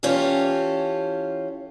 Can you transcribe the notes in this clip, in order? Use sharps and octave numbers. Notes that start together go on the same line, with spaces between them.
E3 C#4 F4 G4 A4